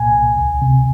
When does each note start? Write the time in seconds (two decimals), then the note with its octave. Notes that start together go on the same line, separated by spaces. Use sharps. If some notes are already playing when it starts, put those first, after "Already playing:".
Already playing: C2 A#2 G#5
0.11 C2
0.36 D2
0.62 C3